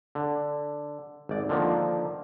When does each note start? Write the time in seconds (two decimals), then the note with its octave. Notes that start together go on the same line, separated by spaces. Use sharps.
0.15 D3
1.29 G#1 D5
1.49 D3 D#3 F3 A#3